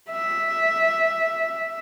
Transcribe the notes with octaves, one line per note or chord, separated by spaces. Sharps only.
E5